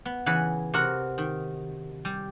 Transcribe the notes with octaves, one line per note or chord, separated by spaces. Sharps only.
B3
C#3 E3 F#5 G#5 B5
C3 F#4 A#4 F#5
D#3
G3